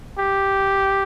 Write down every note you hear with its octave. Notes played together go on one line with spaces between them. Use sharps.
G4